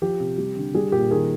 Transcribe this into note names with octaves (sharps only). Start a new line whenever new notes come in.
F3 G4
C3
G3
D3
G3 G#4
A#2 G4
D#3 G#4